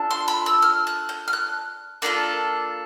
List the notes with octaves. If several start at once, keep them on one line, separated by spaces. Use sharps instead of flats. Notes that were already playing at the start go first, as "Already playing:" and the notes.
Already playing: D4 F4 A4
C6
B5
E6
F6
F#6
G6
F6
F#6
A#3 D4 F4 A4